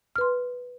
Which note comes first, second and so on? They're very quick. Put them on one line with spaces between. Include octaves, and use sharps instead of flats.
F6 B4 C6